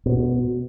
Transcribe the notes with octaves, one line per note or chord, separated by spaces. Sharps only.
B2